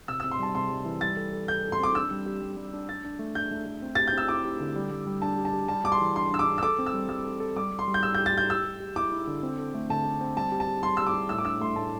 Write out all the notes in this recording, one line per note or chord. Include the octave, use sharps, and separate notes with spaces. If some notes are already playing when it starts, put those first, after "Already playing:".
C3 E6
C3 E6
C6
G3 A5
C3 C6
G3
E3
G3 A6
A4
A4
A4 G6
A4
C6
C4 D6
D4 E6
G3
G4
G3
G3
D4
D4 A6
D4
A3
D4 G6
A3
A3
C4
G4 A6
G6
C4 E6
E4 D6
G4
D3
G3
G3
G3
D4 A5
G4
A5
G4
G3 A5
G3 D6
C6
E3
D4 C6
D4 E6
D6
D4
E6
A4 D6
C4
E6
G3
G3 E6
A4
A4
G3 D6
G3
C6
G3
G6
G4 E6
G4 G6
A6
G4 G6
G4 E6
G4
G4
E4 D6
E4
D3
C4
A4
A3
D3 A5
A3
C4
G3 A5
G4
A5
G4
G3 C6
G3 E6
D6
G3
A2 E6
D6
D4 E6
A3 C6
A2 A5